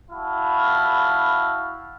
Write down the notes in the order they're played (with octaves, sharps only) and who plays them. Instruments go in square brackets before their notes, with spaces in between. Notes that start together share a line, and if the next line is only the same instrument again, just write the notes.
[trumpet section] E4 F#4 F5 A5 B5